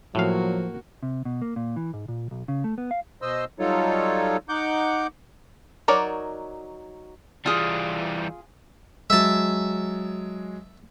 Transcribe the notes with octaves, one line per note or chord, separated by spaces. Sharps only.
A2 F3 F#3 A#3 F#4 F5
C3
B2
A#3
A#2
E3
G#2
A#2
B1
C#3
A3
B3
F5
B2 C5 D#5 C6 E6
F#3 G3 D#4 F4 A4 C#5
D#4 F#5 D6 G6
F#3 D#4 A#4 C#5 D5
E3 G3 F4 G#4
F#3 G#3 E5 A5